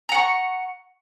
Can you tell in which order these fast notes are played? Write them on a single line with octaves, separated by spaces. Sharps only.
A#5 F#5 C#6